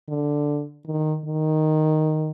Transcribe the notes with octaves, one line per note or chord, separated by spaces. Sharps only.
D3
D#3
D#3